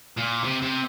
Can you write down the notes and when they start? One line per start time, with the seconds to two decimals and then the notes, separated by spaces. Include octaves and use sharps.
0.18 A#2
0.44 C3
0.62 C3